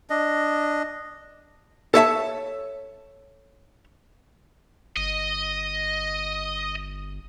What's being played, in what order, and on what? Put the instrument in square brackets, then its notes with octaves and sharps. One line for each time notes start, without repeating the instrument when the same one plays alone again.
[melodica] D4 D#5
[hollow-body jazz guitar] A4 C#5 E5 A5
[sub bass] G1 [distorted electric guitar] D#5